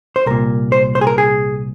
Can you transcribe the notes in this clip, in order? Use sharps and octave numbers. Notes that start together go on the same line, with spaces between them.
C5
C2 A#2 A#4
C5
C5
G#4
A#4
G#4